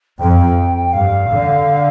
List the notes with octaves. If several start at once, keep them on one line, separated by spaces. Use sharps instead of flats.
F2 G5
G2 F5
D3